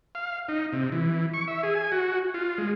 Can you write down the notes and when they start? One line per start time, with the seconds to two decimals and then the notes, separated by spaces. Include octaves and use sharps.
0.15 F5
0.49 D#4
0.73 C3
0.92 E3
1.34 C#6
1.48 E5
1.63 G#4
1.75 G#5
1.92 F#4
2.34 F4
2.58 G#3